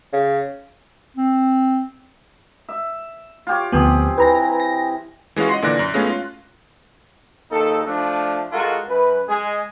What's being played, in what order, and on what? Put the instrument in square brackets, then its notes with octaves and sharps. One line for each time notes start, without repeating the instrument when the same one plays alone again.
[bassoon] C#3
[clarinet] C4
[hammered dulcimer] E5
F4 G4 C#5
[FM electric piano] D2 F3 B3 [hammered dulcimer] C4 G4 G#4
[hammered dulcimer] E3 [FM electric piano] B4 A#5 A#6
[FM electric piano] A#6
[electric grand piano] E3 G#3 C#4 F4 F#4
D#5 F#5 C6
A#2 D3 E3 D5 F#6 A#6
F#2
G#3 A3 B3 C#4 F4
F4
[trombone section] A#1 D#2 D#4 A4
F3 A3 D4
G#3 F4 F#4 A4 A#4
F#2 B4
G#3 G#4